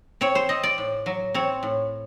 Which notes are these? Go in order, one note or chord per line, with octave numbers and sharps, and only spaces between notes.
C4 C#5
C5
C4 D#5
D5
A2
F#3
C4 C#5
A2